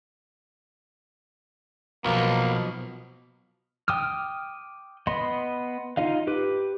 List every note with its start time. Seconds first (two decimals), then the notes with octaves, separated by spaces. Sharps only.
2.04 B1 B2 F3 A#3
3.88 G5 D6 D#6 F6
5.07 B3 D#5 B5 C6
5.97 D#4 F4 D#5 F5
6.27 G4 B4 D6